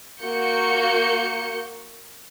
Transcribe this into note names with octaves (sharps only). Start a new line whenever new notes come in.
A#3 F#4 G6 C#7